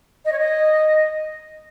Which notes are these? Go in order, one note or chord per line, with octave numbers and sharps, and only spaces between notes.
D#5
C#5
D#5